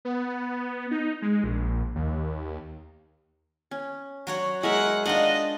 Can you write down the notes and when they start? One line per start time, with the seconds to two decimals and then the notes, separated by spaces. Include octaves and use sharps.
0.05 B3
0.91 D#4
1.22 G#3
1.44 A#1
1.95 D#2
3.71 C#4
4.27 F#3 F#4 C#5
4.63 G#3 A#4 E5 F#5
5.06 D4 D#4 F4 D#5 F#5